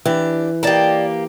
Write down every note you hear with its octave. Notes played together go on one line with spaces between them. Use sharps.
E3 D4 G4
A#3 G4 D5 D#5 A5